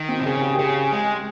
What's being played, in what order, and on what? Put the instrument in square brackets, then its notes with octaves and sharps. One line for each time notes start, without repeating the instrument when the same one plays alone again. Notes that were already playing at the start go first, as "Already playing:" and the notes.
Already playing: [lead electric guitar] D#3
[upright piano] C4
[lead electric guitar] C3
[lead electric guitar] C#3 [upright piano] G#4
[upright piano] G4
G4
[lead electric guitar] C#3 [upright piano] G#4
[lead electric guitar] G#3